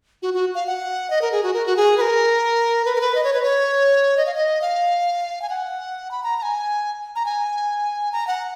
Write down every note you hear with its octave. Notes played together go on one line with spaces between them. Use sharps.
F#4
F#4
F5
F#5
D#5
A#4
G#4
F#4
A#4
F#4
G#4
B4
A#4
B4
A#4
B4
D#5
C#5
B4
C#5
D#5
F5
D#5
F5
G#5
F#5
B5
A#5
A#5
G#5
A#5
G#5
A#5
F#5